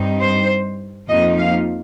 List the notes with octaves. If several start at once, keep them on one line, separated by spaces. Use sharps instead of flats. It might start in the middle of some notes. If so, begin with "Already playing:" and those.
Already playing: G2 G3 C4 D#4
C5
F2 F3 A#3 D#4 D#5
F5